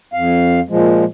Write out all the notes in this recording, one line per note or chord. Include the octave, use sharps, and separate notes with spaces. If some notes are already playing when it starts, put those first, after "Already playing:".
F2 F5
A#2 F3 G#3